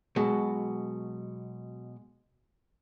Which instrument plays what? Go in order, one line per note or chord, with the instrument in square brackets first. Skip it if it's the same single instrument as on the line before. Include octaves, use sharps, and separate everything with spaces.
[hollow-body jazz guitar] B2 F#3 [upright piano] G#3